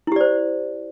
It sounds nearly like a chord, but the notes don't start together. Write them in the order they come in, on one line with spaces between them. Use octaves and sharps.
E4 G4 D5 C5